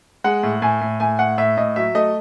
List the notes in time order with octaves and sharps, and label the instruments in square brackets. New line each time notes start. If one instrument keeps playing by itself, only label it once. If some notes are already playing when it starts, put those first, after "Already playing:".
[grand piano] G#3 F#5
A2
A2 G#5
A2
A2 G#5
A2 F#5
A2 E5
A2 D#5
F#3 E5
A3 D#5